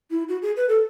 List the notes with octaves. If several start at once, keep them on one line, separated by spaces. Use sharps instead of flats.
E4
F#4
G#4
B4
A4